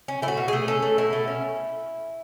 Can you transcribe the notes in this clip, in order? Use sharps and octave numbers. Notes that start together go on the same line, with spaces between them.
C#4
A3 E4
F#4
B2
A3 G#4
C#4 A4
A3
B2 E4
A3
C#4